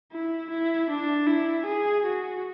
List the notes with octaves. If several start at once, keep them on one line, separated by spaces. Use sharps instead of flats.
E4
E4
D4
E4
G#4
F#4